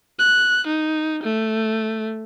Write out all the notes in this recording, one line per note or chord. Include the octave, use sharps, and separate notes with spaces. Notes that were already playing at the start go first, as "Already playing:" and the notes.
F#6
D#4
A3